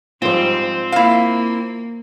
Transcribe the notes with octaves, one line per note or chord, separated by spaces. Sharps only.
G#2 F3 G3 C4 F4 C5
A#3 E4 F5